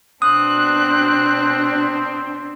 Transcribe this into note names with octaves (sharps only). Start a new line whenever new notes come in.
B2 C4 D4 D#6 F#6